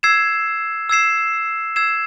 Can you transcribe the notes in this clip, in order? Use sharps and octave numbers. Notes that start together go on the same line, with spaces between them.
E6 G#6 C7 E7
E6 G#6 C7 E7
E6 G#6 C7 E7